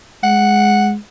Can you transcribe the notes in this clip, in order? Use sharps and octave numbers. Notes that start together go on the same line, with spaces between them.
G#3 F#5